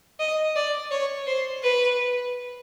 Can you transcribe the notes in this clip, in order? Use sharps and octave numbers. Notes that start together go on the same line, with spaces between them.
D#5
D5
C#5
C5
B4